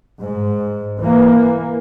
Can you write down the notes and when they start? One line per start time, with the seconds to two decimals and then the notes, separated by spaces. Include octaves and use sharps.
0.22 G#2
0.99 E3 A#3